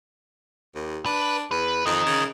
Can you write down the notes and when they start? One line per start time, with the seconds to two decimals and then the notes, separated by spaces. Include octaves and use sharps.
0.75 D#2
1.06 D4 B4
1.51 E2 B4
1.86 F2 A#4 D#5
2.06 C#3